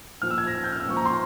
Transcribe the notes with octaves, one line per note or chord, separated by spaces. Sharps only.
A#2 F3 F6
E6
G#6
A#6
G#6
G6
F6
E6
A#2 F3 C#6
A#5
C6